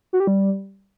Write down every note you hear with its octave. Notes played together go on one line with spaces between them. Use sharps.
F#4
G4
G3